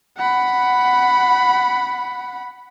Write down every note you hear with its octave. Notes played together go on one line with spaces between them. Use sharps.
F#5 B5